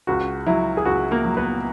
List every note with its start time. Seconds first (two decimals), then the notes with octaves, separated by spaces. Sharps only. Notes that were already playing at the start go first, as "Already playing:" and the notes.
0.07 C#2 F#4
0.47 F#3 E4
0.77 G#4
0.85 C#2 F#4
1.11 A#3 A#4
1.25 F#3
1.37 B3 B4